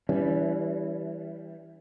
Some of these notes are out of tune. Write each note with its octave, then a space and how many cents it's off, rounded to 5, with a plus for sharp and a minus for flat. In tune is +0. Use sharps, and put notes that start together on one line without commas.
E3 +0 G3 +0 C#4 +40